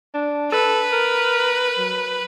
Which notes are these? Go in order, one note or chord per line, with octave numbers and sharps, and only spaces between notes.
D4
A4 B4
A#4
F#3